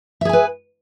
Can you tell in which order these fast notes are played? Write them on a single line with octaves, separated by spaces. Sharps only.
E5 G#4 G#5 B4